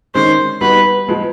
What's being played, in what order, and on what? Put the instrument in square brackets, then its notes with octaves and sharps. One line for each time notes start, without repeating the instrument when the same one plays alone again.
[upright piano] D#3 G#3 C#4 [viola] C5
[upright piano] G3 B3 D#4 F#4 [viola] B4
[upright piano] F3 G#3 B3